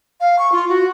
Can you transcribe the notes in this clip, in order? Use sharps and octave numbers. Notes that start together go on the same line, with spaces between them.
F5
C#6
F4
F#4